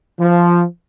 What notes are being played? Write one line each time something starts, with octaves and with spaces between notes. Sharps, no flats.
F3